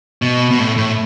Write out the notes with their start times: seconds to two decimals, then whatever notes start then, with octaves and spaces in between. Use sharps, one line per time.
0.22 B2
0.51 B2
0.59 A2
0.77 A2